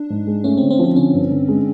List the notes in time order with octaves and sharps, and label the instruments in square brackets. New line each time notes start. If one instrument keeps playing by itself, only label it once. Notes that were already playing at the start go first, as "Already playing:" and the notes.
Already playing: [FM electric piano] D4
[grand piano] G#2
G#3
[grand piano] A3 [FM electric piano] C#4
[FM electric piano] C4
[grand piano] D3
[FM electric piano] C4
[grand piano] F3
[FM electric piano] C4
[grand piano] D3 [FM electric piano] C#4
[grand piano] G2
D3
G#3